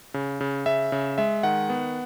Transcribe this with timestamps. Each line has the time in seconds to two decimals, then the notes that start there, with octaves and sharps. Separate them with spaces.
0.14 C#3
0.41 C#3
0.66 C#3 E5
0.92 C#3
1.18 G#3 E5
1.43 D#3 F#5
1.70 B3